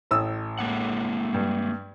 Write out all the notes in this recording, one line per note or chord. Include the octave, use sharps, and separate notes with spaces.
A1 D#6 E6
G#3 A#3 F#5
G2